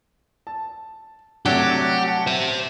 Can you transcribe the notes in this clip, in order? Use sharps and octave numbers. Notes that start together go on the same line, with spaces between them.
A5
C3 F#3 A3 D4 G4 F#5
A5
C5 E5